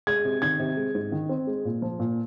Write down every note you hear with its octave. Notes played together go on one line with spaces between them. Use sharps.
G#3 G#6
C3
D#3 G#6
C3
G#3
G#2
D#3
C4
G#3
A#2
F3
A#2